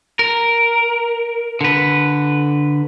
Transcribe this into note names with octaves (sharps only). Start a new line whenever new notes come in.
A#4
D3 B4